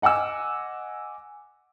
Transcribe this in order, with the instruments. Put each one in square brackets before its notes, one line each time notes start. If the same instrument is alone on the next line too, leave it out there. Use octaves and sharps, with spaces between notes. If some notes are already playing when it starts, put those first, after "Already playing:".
[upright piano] D#5 F#5 G#5 D6 E6